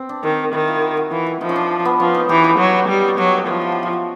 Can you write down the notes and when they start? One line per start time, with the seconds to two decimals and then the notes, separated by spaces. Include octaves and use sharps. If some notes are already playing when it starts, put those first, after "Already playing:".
Already playing: C4
0.09 D4
0.23 D#3 D#4
0.52 D#3 E4
0.68 F4
0.76 G4
0.82 F#4
0.97 F#4
1.11 E3 F4
1.26 E4
1.41 F3 D#4
1.49 C#4
1.56 D4
1.85 B3
2.00 F3 C#4
2.15 D#4
2.29 E3 G4
2.44 G4
2.58 F#3
2.88 G3
3.10 F#4
3.18 F#3 G4
3.32 F#4
3.47 F3 E4
3.61 G4
3.72 F#4
3.83 F4
3.93 F#4